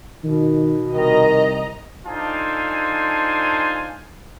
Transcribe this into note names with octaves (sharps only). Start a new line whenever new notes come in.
B2 D#3
C2 D#3 D#5 A#5
D4 D#4 F4 A4 C5 G#5